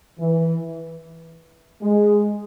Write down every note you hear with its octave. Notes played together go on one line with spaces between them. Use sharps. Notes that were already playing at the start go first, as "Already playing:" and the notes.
E3
G#3